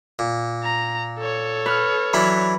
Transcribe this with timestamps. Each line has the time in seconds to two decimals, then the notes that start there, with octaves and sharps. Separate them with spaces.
0.19 A#2
0.63 A#5
1.19 A4 C#5
1.66 B4 F6
2.14 E3 F#3 D4 B5